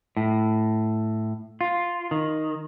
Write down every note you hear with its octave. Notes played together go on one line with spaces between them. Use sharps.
A2
F4
D#3